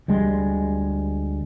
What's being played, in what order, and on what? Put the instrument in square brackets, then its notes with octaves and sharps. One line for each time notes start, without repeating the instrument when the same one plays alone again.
[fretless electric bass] D2 G3 G#3